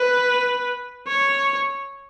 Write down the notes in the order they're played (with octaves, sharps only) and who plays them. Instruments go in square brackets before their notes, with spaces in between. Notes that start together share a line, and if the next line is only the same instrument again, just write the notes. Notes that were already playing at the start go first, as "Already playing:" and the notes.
Already playing: [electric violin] B4
C#5